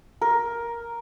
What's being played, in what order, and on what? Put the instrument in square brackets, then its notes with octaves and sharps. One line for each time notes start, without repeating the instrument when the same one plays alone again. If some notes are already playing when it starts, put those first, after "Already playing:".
[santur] A#4